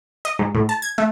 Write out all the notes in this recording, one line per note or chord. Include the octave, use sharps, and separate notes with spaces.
D#5
G#2
A2
A5
G#6
A3